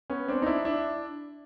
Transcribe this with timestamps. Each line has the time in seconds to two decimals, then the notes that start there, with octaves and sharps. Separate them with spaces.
0.10 B3 C#4
0.28 C4 D4
0.42 D#4
0.46 D4 E4
0.65 D4 E4